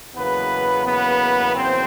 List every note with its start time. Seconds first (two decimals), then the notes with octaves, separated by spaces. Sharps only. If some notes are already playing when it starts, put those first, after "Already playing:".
0.15 E2 C#3 F#3 A#3 B3 B4
0.85 B3 B4
1.56 C4 C5